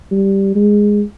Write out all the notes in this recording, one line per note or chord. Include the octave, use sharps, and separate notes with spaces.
G3
G#3